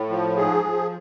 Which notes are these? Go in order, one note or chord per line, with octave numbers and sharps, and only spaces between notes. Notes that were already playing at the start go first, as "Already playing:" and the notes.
Already playing: A2
F3
G#2 G#4
F3